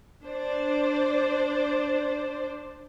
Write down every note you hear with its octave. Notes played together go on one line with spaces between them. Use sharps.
D4 C5 D5